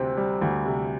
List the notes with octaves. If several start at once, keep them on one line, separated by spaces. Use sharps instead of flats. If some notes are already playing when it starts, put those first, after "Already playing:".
Already playing: D2 C3 G3 C4
G3
D2
C3